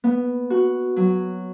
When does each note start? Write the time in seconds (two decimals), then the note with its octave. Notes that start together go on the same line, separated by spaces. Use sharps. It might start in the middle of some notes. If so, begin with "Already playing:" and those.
0.04 B3
0.50 F#4
0.96 F#3